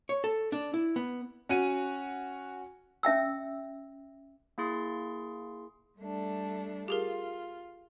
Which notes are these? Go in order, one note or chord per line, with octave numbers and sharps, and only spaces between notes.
C#5
A4
D4
E4
B3
C#4 F#4 D#7
C#4 E5 G5 E6
A#3 E4 G#4 C6
G3 A3 D4
F4 G4 G#4 A#4